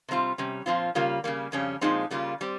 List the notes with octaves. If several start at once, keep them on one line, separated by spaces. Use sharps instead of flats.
C3 G3 C4 F4
C3 G3 C#4
A#2 F3 C4 F4
C#3 G3 A#3 F4
C#3 G3 A#3
F2 C#3 G3 C#4
A#2 F3 G#3 C4 D#4
C#3 G3 A#3 F4
G3 C4